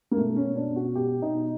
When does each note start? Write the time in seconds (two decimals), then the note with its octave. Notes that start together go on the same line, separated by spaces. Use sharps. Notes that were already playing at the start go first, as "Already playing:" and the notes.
0.11 A#3
0.17 B2 A3
0.36 C#4
0.43 B2
0.56 D4
0.70 B2
0.76 F#4
0.95 B2 G4
1.22 B2 D#4